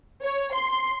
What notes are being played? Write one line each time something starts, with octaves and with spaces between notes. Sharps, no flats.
C#5
C6